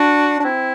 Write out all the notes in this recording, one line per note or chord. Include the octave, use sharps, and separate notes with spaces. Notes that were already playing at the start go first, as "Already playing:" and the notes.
Already playing: D4 F#4
D4
C4 E4